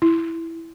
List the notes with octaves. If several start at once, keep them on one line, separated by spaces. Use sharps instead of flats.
E4